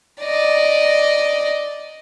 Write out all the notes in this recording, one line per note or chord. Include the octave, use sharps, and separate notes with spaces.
D5 D#5